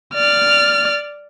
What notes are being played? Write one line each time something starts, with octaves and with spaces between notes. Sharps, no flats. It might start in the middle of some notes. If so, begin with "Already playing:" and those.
D5 F6